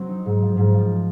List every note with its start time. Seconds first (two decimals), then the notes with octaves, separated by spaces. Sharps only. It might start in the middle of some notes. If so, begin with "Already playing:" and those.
Already playing: F#3 C4
0.08 D#4
0.26 G#2
0.42 F3
0.57 G#2
0.74 F3